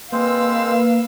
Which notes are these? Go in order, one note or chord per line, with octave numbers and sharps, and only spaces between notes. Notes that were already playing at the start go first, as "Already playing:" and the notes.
G#3 A#3 C4 B4 C5 F5 E6